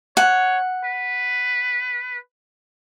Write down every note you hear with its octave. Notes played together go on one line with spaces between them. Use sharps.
C#5 F#5
B4